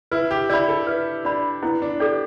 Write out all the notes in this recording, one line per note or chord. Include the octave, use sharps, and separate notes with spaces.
E4 B4
G4
E4 D5 B5
A4
E4 B4
D4 D5 B5
B3 E4
D4
G4 A4 D5